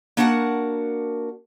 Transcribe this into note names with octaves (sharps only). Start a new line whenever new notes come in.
A#3 D4 F#4 A#4 F#5 A5